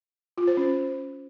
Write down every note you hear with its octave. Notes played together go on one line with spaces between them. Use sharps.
F4
C5
C#4